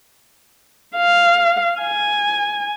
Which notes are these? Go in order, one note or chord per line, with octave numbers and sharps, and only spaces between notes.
F5
G#5